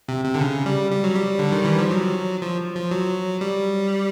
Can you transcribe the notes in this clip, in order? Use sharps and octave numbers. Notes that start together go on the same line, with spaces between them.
C3
C3
D3
C#3
G3
G3
F#3
G3
D3
D#3
E3
F3
F#3
F3
F3
F#3
G3